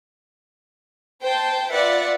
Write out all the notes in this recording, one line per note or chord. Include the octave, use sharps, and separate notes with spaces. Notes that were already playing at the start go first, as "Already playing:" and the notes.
C5 G5 A5
F4 B4 D5 E5 F#5